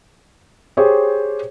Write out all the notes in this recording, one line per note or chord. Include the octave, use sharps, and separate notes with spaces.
G4 G#4 C5 C#5